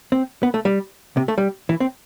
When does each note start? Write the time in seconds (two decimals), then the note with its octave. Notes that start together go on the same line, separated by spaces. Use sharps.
0.12 C4
0.43 B3
0.54 A3
0.65 G3
1.17 C3
1.28 A3
1.38 G3
1.69 E3
1.80 C4